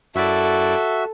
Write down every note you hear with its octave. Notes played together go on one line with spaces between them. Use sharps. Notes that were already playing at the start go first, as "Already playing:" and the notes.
F#2 E4 F#4 A4 D5 E5